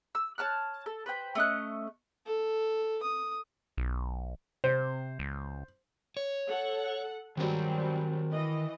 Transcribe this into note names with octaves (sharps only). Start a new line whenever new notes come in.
E6
C#5 A5 F6 F#6
A4
B4 C5 G5
A3 C#4 D#5 F#6
A4
D#6
B1
C3 C5
C#2
C#5
A4 F#5
D#3 F#3 G3 C4 C5
E3 D#5